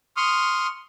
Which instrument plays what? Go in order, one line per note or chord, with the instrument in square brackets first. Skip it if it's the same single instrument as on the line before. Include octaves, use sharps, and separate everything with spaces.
[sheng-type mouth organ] C6 C#6 D#6 F6